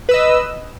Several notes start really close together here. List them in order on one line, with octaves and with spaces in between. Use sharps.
B4 E6 D#5